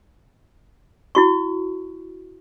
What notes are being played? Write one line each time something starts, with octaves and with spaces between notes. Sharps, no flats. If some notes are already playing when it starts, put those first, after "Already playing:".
E4 F#4 C#6